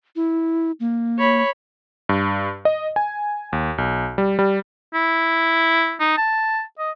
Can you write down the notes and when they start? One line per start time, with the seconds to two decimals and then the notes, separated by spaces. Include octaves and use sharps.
0.16 E4
0.80 A#3
1.19 C#5 B5
2.09 G2
2.65 D#5
2.96 G#5
3.53 D#2
3.78 B1
4.18 G3
4.39 G3
4.94 E4
6.00 D#4
6.17 A5
6.79 D#5